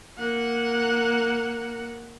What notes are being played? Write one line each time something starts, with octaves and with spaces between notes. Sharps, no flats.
A#3 F#5